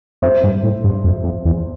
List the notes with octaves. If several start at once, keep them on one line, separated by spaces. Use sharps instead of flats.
F2 C5 E5
G2
A2
G2
F2
F2
E2